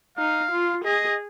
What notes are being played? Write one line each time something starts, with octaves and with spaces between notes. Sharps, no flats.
D#4 F5
F4
G#4 D#5